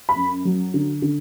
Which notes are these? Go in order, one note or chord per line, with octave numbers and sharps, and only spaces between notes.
B5
F#2
F#3
D3
D3